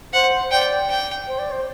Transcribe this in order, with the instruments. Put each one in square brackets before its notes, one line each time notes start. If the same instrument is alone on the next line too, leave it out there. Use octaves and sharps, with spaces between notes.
[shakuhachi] C5 [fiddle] F#5
[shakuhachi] D5 [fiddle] G5
[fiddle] G5
[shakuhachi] C5
D5
C5